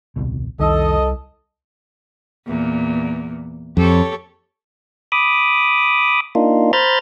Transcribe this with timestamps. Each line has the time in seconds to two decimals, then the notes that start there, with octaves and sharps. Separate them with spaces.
0.16 D#1 C2 B2
0.59 F1 C2 D#3 A4 D#5
2.47 E2 A#2
3.77 F2 G4 A4 C#5
5.12 B5 D6 D#6
6.35 A#3 D4 D#4 F4
6.73 C5 A#5 B5 F6 G6 A6